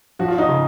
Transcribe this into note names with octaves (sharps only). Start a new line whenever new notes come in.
F3 F#4
F4
D#4 F#4
C#3